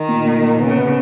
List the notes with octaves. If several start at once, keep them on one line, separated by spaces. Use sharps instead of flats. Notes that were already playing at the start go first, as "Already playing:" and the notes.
Already playing: D#3
A#2
A#2
A#2
C#3 B3
B3